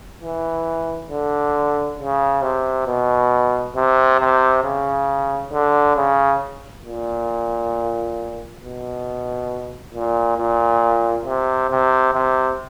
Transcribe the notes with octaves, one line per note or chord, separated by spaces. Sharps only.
E3
D3
C#3
C3
B2
C3
C3
C#3
D3
C#3
A#2
B2
A#2
A#2
C3
C3
C3